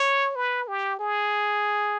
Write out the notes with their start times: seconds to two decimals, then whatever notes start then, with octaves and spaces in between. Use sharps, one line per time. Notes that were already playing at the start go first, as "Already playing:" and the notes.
Already playing: C#5
0.36 B4
0.68 G4
0.99 G#4